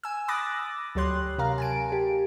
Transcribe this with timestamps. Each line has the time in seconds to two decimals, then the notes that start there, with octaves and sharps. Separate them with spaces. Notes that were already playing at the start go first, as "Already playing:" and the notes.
0.03 G#5 E6
0.28 B5 D6 D#6 F#6 A6 A#6
0.95 D2 F#3 G4 C#5 C6 F#6
1.38 C3 A#4 F5 A#5
1.58 G#5 A5 D7
1.92 G4